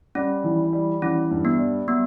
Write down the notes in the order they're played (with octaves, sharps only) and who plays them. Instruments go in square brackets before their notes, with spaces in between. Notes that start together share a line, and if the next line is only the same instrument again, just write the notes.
[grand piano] G3 [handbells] C#4
[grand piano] E3
G3
[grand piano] E3 [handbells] C#4
[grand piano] G2
[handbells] B3
[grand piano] G3
[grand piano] F#3 [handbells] B3